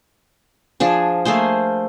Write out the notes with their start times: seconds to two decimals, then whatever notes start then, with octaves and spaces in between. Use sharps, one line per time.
0.80 F3 D4 G#4
1.25 A3 A#3 G#4 C5